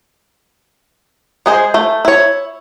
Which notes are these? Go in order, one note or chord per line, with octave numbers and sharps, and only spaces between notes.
G#3 G#4 C5
A3
E4 C#5